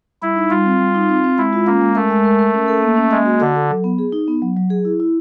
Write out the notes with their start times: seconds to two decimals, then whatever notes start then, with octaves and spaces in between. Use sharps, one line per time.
0.22 G3 E4
0.36 D#4
0.51 G3 F4
0.65 C4
0.80 G3
0.94 D#4
1.09 C4
1.24 C4
1.38 G#3 E4
1.53 F4
1.66 A#3 C#4
1.81 G#3
1.96 A3 A#4
2.10 G#3
2.25 A#4
2.39 A#4
2.54 C#4
2.68 A4
2.82 A#3
2.97 C#4
3.11 G#3 A#3
3.26 F#4
3.40 D3 F#4
3.56 A4
3.70 F#3
3.84 B3
3.99 G#4
4.12 D#4
4.28 B3
4.42 F#3
4.57 F#3
4.70 G#4
4.85 E4
5.00 E4